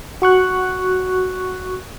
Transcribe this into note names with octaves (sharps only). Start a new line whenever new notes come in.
F#4 C#6 F#6